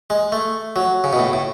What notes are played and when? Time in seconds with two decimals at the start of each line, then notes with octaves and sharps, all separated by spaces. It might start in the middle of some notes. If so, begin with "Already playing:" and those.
0.10 G#3
0.32 A3
0.76 F#3
1.04 C#3
1.13 B2
1.19 A2
1.33 A2